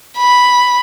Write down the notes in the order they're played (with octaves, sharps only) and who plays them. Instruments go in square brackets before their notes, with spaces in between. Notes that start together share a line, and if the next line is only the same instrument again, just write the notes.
[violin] B5